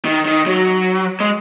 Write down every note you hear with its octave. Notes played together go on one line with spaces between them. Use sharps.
D#3
D#3
F#3
G#3